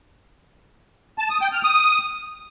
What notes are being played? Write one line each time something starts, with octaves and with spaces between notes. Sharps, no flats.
A5
D#6
G5
F6
D#6